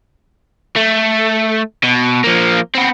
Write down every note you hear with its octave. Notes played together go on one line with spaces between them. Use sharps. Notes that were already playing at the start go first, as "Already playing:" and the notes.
A3
B2
F3 A#3
B3 C4